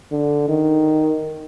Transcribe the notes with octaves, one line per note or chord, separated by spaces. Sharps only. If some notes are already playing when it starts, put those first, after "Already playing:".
D3
D#3